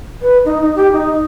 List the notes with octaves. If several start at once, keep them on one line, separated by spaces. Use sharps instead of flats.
B4
D#4
D#4
G4
D#4